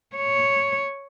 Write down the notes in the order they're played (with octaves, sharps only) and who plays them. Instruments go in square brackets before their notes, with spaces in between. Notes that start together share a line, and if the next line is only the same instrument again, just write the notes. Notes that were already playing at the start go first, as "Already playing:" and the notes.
[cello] C#5